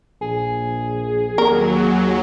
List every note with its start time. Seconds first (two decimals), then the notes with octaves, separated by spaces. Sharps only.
0.21 A#1 G#4
1.38 D#2 F#3 A#3 A#4